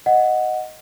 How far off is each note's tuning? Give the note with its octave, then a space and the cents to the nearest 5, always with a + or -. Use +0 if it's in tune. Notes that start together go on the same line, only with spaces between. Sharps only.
D#5 +0 F#5 -5